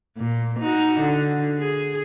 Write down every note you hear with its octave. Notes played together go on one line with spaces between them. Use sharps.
A#2
D#4 F#4
D3
G#4